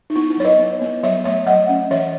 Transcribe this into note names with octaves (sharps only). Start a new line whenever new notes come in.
D#4
B3 E4
E4
F#3 C#5
B4 D#5
B3
B3
F#3 C#5 E5
A3 C#5 E5
F#3 D#5 F#5
C#4
E3 C#5 E5